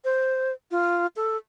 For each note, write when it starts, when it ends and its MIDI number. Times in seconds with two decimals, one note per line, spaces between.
0.04 0.52 72
0.71 1.06 65
1.16 1.37 69